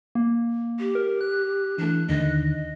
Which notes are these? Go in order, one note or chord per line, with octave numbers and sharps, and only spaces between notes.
A#3
G4
A#4
F#6
E3 A3 D4
D#2 D3 D#3 D#5